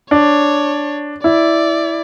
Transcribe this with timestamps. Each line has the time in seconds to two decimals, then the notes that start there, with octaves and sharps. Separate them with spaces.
0.11 D4 C#5
1.24 E4 D5